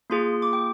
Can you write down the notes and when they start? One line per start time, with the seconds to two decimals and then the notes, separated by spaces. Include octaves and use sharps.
0.10 A#3 F4 G#4 C6
0.42 D6
0.53 G5